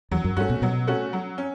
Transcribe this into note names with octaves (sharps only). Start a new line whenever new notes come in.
E2 F#3
F#2
G2 A3 C#4 F#4
B2
B2 F#3
A3 C#4 F#4
F#3
C#4